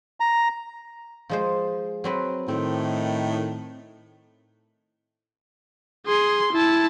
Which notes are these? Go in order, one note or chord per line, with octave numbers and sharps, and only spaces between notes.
A#5
F3 G#3 C5
F#3 C4 B4
A2 D#3 C4
G#4 C6
E4 A5